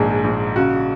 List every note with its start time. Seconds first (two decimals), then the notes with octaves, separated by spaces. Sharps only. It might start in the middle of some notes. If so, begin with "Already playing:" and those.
Already playing: A#1 G#2 D#3 G#4
0.24 A#1
0.56 C#3 F#4